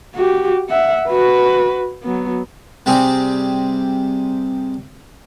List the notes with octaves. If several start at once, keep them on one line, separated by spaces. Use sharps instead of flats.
F#4 G4
E5 F#5
F#4 B4
F#3 B3
C3 G3 C4 G#4